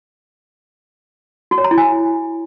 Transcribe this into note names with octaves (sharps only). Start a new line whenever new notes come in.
F#4
C#5
A#5
E4
G#5